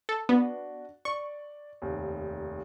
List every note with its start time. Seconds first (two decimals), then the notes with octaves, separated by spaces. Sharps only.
0.09 A4
0.29 B3 D4 F#4
1.05 D5 C#6
1.82 F1 D#2